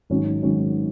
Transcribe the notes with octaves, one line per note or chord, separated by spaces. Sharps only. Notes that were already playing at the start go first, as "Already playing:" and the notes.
G#1 G#2 D#3 F#3 C#4
G#1 G#2 D#3 F#3 C#4